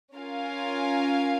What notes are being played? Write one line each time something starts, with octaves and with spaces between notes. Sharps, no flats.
C#4 F4 A#4 F5 G#5